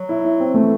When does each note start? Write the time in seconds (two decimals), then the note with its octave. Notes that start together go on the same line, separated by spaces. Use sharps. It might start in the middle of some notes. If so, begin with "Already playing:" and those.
Already playing: F#3
0.09 E4
0.25 E4
0.40 C4
0.54 E3 A3